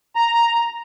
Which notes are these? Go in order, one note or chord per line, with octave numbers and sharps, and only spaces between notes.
A#5